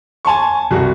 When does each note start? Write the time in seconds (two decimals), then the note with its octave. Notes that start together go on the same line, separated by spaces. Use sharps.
0.25 G#5 A5 C6 C#6
0.71 C2 F#4